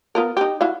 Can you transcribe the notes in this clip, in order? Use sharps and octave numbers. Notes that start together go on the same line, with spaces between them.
B3 F4 A#4
D#4 G4
E4 F#4 F5